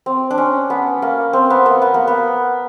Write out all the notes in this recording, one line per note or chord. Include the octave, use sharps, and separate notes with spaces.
C4
D4
C#4
B3
A#3
C4
B3
A#3
B3
A#3
B3